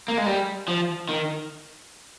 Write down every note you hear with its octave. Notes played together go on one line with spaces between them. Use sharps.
A#3
G#3
G3
F3
D#3